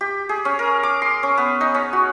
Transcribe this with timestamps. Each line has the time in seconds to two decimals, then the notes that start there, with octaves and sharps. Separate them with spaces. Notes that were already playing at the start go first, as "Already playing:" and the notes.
0.01 G4
0.29 G#4
0.45 C#4
0.59 A#4
0.83 D6
1.02 C6
1.23 C#4
1.38 B3
1.61 D#4
1.75 C#4
1.93 F#4